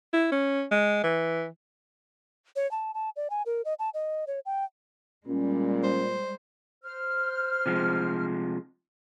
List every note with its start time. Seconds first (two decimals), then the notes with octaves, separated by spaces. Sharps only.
0.14 E4
0.32 C#4
0.71 G#3
1.04 E3
2.56 C#5
2.71 A5
2.94 A5
3.16 D5
3.30 G#5
3.46 A#4
3.65 D#5
3.79 A5
3.94 D#5
4.27 C#5
4.46 G5
5.27 A#2 G3 G#3 C#4
5.84 C5
6.83 C5 F6
7.66 C3 F3 G#3